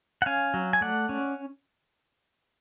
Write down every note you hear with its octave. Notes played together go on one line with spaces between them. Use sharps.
F#5
C#4 F5 G#5
F#3
G#5
A3 D5 F#5
C#4